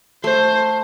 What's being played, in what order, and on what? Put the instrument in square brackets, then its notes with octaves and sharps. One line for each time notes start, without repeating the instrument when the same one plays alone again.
[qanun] A3 [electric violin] C5